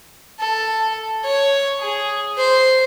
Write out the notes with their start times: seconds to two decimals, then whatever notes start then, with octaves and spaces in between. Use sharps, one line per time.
0.39 A4
1.24 C#5
1.80 G#4
2.38 C5